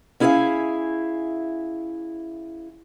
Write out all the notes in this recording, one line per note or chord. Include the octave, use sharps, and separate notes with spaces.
C#4 E4 G#4 C#5 E5 F5